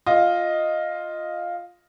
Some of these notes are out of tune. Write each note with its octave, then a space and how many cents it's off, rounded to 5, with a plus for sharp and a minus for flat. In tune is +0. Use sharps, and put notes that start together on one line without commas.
F4 +0 D#5 +0